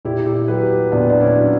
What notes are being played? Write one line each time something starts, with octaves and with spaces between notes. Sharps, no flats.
A#2 E4 G4
E4 G4
F#3 G4 B4
A#2 B3 D4
D4
C#4 E4
F#3